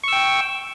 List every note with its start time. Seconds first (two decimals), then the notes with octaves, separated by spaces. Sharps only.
0.04 C#6
0.08 E6
0.12 G5